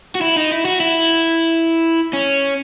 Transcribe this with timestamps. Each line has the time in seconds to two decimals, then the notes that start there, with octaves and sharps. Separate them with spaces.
0.15 F#4
0.21 E4
0.36 D#4
0.52 E4
0.65 F#4
0.80 E4
2.13 C#4